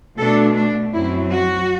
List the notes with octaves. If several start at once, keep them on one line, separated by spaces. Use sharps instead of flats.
B2 A3 D4 A4
D4
F#2 F#3 C4 E4
F#4